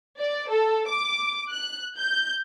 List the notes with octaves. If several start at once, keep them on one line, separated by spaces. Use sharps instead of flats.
D5
A4
D6
F#6
G6